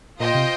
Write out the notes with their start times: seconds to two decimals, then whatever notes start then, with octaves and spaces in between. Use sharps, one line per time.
0.20 A#2 F4 C5 D#5 G5
0.35 C3